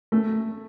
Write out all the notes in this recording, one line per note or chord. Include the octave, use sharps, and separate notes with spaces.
A3